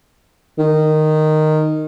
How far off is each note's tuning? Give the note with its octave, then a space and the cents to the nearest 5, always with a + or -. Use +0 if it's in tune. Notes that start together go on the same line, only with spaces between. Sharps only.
D#3 -10